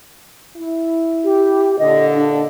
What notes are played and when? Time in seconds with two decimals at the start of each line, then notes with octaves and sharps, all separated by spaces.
0.56 E4
1.24 G4
1.79 A#2 D3 D#5
2.15 D4